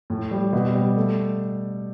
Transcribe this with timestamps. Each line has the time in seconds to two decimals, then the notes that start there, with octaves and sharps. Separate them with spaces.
0.10 A2
0.31 G3
0.53 B2
0.75 G3
0.97 A3